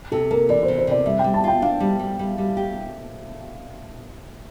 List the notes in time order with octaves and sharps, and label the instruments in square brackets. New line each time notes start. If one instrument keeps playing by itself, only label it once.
[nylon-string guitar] C3 [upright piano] A4
[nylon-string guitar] A#3 [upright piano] A#4
[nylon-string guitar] E3 [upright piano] D5
[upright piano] C5
[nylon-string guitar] C3
[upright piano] C5
[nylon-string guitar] C3 [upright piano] D5
[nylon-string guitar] G3 [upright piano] E5
[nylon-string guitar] G3 [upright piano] G5
[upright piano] A5
[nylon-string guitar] F4 [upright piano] G5
[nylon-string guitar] D4 [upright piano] F5
[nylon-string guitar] G3
G3
G3
G3
G4